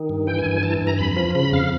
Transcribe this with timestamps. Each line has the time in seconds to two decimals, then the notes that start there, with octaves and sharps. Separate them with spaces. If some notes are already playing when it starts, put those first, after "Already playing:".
Already playing: D#3
0.09 G2
0.27 E3 G5
0.39 G#5
0.46 G2
0.51 G#5
0.63 E3 A5
0.82 G2
0.87 A#5
0.99 F2 B5
1.16 F3
1.35 C#3 B5
1.52 F2 F5